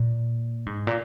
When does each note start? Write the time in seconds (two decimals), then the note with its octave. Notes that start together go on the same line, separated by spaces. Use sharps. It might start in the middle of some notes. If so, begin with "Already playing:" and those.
Already playing: A#2
0.66 G#2
0.87 A#2